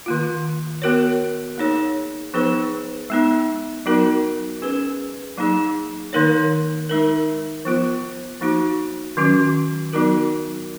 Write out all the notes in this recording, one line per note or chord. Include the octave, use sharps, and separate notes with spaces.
D#3 A#3 F4
B3 F#4 A#4 C#5
A#3 D#4 G#4 C#5
F3 B3 D#4 G#4 B4
G#3 B3 D#4
F#3 B3 D#4 F#4 A#4
C#4 G#4 B4
F#3 A#3 D#4 G#4
D#3 A#3 D#4 A#4 C#5
G#3 D#4 A#4
F3 B3 F4
F3 A#3 D#4 F#4
D#3 F#3 C#4 F#4
F#3 B3 D#4 F#4 A#4